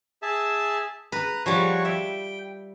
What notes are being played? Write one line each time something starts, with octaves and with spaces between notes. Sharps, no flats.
G#4 E5 A5
B4 A#5
F3 G3 F#4 C#5
E5 G5